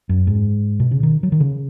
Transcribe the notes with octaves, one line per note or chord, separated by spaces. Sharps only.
F#2
G#2
B2
C#3
D#3
F#3
D#3
C#3